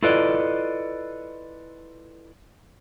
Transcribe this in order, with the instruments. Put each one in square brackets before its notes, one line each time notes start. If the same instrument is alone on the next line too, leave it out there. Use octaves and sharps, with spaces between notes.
[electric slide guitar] E4 F4 A4 B4 D5 D#5